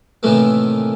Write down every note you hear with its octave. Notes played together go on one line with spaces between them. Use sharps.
A2 C3 D#3 E3 A3 A#3